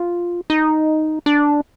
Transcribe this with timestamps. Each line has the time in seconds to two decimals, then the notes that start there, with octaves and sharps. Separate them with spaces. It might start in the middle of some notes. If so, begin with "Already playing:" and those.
Already playing: F4
0.50 D#4
1.26 D4